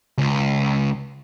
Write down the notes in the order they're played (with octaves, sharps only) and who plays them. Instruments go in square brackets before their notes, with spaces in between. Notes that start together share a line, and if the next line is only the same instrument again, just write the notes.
[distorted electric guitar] C#2